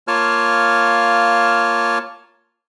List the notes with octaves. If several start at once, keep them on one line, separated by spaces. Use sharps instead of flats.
A#3 F4 C#5 A5 F6